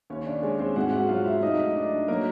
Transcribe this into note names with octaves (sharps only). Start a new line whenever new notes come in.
D#2 C#4 C#5
D4 D5
G#3 C#4 C#5
C4 C5
G#2 F#4 F#5
F#4 F#5
F#3 F4 F5
E4 E5
A3 D#4 D#5
D4
F#3 A#3 A#4